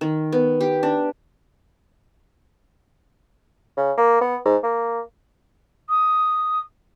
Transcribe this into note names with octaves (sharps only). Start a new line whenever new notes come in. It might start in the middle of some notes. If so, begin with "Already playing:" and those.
D#3
B3
G4
D4
C#3
A#3
B3
G#2
A#3
D#6